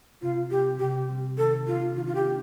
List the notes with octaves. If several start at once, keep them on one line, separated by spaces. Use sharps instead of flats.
C3 F4
G3 C4 G4
C3 G4
G3 C4
D#3 A4
A#3 D4 F4
D#3 F4
F4
G4
A#3 D4